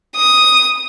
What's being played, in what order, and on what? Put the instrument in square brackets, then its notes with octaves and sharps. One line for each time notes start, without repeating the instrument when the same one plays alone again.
[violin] D#6